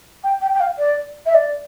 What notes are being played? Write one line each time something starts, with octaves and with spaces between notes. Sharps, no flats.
G5
G5
G5
F5
D5
E5
D5